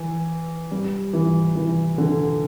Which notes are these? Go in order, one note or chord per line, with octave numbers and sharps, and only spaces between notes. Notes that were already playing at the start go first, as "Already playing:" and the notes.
Already playing: E3
G3
E3
E3
D3